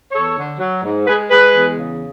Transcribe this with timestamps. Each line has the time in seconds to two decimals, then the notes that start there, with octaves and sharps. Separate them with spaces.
0.12 E2 A4 C#5
0.36 D3
0.59 F#3
0.83 G#2
1.06 G#3 G#4 B4
1.30 G#3 G#4 B4
1.54 E2
1.77 C#3